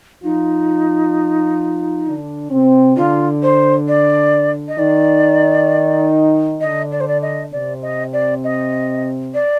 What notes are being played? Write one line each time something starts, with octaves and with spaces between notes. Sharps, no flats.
F3 D#4 F4
D3 D4
C3 C4
D3 D4 F4
C5
D5
D#5
D#3 D#4 D5
D3 D4 D#5
D5
C5
D5
D#5
C3 C4 D5
D#5
D5
D#5
D5